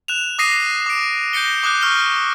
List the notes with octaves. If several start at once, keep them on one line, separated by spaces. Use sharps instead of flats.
F#6 E7 F7
D6 D#6 A#6 C7 D#7
D6 D7
G6 A#6 C#7 G7
D6 D#6 F#6 G6
C#6 F6 G7